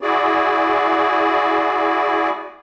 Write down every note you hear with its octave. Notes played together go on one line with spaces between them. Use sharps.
E4 F#4 G#4 D5